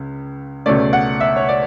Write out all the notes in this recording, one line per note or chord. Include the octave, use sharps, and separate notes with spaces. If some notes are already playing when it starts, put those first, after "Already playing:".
Already playing: C#2 C#3
C#2 B2 A3 C#4 D5
F#5
E5
C#5
D5